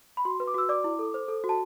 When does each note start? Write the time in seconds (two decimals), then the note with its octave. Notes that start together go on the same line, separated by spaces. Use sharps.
0.17 B5
0.25 F#4 C6
0.40 B4
0.47 D6
0.54 F#4 E6
0.69 D5 D6
0.84 E4
0.99 A4
1.14 C5
1.28 A4
1.44 F#4
1.49 A5